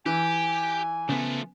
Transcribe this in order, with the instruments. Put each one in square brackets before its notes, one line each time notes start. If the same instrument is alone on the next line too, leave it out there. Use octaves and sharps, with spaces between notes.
[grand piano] E3 [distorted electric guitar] G4 [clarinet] G#5
[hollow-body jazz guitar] C#3 B3 [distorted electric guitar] F3 A3